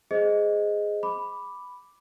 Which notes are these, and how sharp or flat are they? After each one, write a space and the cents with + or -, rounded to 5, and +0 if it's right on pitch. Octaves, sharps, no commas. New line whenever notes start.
G#4 +0 C5 -10 D#5 +0
B5 +0 D6 +0